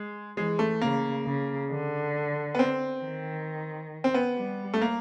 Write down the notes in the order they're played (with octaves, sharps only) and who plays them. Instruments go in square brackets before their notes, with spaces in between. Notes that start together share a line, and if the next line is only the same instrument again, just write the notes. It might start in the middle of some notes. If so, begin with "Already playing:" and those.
Already playing: [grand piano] G#3
[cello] E3 [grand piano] G#3
[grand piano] A3
[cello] C#3 [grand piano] A#3
[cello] C#3
D3
[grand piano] B3
C4
[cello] D#3
[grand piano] C4
B3
[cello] G3
[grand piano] A3
A#3